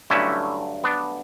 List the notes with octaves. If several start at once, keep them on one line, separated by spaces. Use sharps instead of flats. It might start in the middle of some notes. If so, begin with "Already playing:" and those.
G2 D3 F#3 A3 C#4 E4
B3 D4